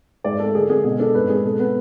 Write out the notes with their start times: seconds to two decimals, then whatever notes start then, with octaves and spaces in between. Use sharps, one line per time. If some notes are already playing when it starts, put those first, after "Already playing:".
0.24 G#2 D5
0.39 A3 A4
0.55 D3 G#4
0.70 G#3 G#4
0.84 B2 G#4
0.99 D4 A4
1.15 G#2 B4
1.29 G#3 G#4
1.44 B2 A4
1.59 B3 B4